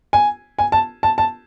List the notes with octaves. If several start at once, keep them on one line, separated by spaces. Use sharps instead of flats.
G#5
G#5
A5
A5
A5